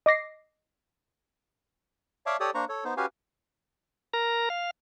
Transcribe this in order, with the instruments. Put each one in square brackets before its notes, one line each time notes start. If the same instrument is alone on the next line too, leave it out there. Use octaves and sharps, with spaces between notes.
[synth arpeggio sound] D#5 D6 A#6 C7
[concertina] C#5 D5 E5 F5 A5 D6
G4 A4 C#5 D5 D#6
A#3 D4 C5 A#5 C#6
A4 C#5
B3 D#4 C5
C#4 F#4 G4 B4 F5 G#5
[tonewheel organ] A#4 A#5
F5